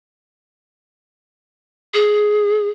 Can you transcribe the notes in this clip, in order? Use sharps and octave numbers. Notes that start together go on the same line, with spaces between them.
G#4